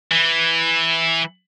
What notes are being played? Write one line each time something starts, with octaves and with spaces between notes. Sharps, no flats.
E3